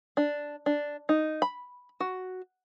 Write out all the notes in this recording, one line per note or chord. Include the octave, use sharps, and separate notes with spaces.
D4
D4
D#4
B5
F#4